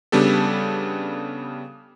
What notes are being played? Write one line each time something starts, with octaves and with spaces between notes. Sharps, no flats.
C#3 G3 B3 D4 G4 A4